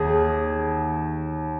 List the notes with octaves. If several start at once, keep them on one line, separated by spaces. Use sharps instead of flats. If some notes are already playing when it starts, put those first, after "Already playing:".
Already playing: D#2 G#4